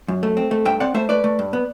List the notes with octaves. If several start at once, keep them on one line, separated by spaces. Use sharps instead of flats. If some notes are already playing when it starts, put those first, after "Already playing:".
F#2
A3
C4
A3
G2 E5 G5
C4 D5 F#5
A3 C5 E5
A3 B4 D5
A3
G2
B3